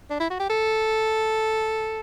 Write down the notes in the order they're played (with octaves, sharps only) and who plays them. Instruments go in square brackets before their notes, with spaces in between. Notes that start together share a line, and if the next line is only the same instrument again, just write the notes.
[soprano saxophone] D4
E4
F#4
G4
A4